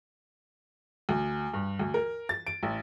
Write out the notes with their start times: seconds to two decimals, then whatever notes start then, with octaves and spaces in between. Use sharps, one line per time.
1.09 D2
1.54 G2
1.79 D2
1.94 A#4
2.29 A6
2.47 D7
2.63 A1